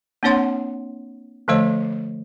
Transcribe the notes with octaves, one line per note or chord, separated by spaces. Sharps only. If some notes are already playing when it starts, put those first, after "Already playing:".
A#3 C4 D4 C#5 F#5 C6
D3 F3 A3 C5 D#5